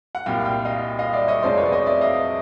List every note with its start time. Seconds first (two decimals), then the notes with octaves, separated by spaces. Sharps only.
0.15 F#5
0.26 C2 A#2 G3 F5 G5
0.45 F5 G5
0.65 D#5 F5
0.99 D#5 F5
1.13 D5 E5
1.28 C#5 D#5
1.42 F2 C3 F3 G#3 C5 D5
1.57 B4 C#5
1.65 D5
1.72 C#5 D#5
1.86 D5 E5
2.01 D#5 F5